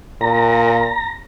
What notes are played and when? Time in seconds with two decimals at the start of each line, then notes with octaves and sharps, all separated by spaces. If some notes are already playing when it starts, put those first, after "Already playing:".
0.21 A#2 A#5